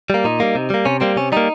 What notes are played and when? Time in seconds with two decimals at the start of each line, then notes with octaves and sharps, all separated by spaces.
0.10 G3 A#3
0.24 A#2 D#4
0.40 G3 A#3
0.55 C3
0.70 G3 A#3
0.85 C3 C#4
1.01 G3 A#3 C4
1.16 C3 C#4
1.32 G3 A#3 D#4